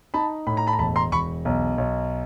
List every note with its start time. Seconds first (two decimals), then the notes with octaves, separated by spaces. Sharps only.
0.14 D#4 A5 B5
0.47 A2 B5
0.57 A#5
0.67 A5 B5
0.73 A#5
0.79 E1 A5 B5
0.96 A#5 C6
1.12 E1 B5 C#6
1.45 B1
1.78 B1